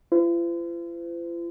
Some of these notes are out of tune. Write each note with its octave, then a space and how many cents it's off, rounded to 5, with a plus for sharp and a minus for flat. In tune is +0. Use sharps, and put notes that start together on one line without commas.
F4 -45 C5 -45